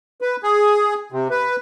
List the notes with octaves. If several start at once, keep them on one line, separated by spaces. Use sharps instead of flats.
B4
G#4
C3
B4